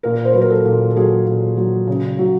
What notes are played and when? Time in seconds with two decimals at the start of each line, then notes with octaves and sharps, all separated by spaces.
0.03 A#2 A#4
0.25 C5
0.33 F#3 B4
0.42 A#4
0.50 A4
0.65 A#2
0.90 A4
0.96 F#3 G#4
1.26 A#2
1.57 F#3
1.87 C#3
2.19 F#3